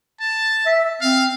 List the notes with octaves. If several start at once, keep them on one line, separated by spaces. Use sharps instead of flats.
A5
E5
C4 F5